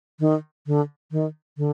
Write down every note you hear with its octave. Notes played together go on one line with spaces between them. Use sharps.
D#3
D3
D#3
D3